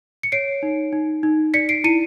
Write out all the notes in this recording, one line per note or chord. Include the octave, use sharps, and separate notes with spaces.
C#7
C#5 C7 D7
D#4
D#4
D#4
D5 B6 C#7
C7 D7
E4 C#7 D#7